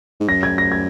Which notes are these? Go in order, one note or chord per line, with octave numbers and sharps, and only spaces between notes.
G#2
F#2 A#6
G#6
A#6
G#6